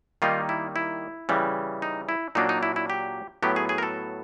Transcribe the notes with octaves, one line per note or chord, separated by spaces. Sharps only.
D#3 G3 A#3 D#4 F4
E4
E4
C#3 E3 G3
D#4
E4
A#2 F#3 A#3 D4 D#4
D#4
E4
E4
G4
A2 F#3 B3 G4
G#4
G#4
A#4
A4